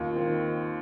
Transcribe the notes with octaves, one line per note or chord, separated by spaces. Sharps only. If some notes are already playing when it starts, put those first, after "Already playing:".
Already playing: D#2 F4
D#3 C4